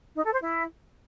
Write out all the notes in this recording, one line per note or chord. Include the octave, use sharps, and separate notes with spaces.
D#4
A4
C5
E4